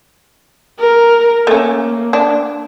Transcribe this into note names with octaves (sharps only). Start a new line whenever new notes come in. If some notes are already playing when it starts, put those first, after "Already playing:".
A#4
A3 A#3 C#4
D4